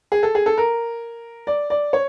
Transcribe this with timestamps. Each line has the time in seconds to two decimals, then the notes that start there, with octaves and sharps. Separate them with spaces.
0.12 G#4
0.23 A4
0.35 G#4
0.46 A4
0.58 A#4
1.47 D5
1.70 D5
1.93 C#5